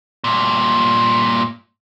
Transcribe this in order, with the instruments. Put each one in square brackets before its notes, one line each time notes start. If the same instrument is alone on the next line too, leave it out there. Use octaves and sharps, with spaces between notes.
[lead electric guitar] G2 A#2